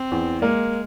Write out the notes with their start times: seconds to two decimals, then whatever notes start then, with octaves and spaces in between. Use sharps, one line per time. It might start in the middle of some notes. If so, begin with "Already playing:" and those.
Already playing: C4
0.11 E2
0.42 G#3 A#3